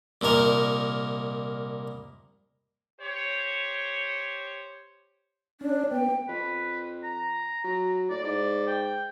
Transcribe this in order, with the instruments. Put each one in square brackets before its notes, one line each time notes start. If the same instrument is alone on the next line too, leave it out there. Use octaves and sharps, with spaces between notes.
[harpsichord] C2 A#2 D#3 A#4
[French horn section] G4 C5 C#5
[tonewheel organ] C#4 [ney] D4
[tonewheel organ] B3 [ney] G5
[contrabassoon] F2 [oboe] B4
[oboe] A#5
[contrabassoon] F#3
[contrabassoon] A2 [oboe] D5
[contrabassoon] G#2 [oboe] D5
[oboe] G5